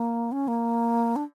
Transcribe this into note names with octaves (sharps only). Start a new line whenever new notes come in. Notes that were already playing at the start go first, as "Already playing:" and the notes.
Already playing: A#3
C#4
A#3
D4